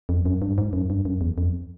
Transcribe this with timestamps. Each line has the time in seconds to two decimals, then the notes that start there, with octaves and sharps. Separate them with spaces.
0.09 F2
0.25 F#2
0.42 G2
0.58 G#2
0.73 F#2
0.90 G2
1.05 F#2
1.21 E2
1.38 F2